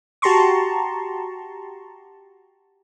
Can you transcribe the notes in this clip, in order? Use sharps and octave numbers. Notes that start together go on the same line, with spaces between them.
F#4 G4 A5 A#5 C6 C#6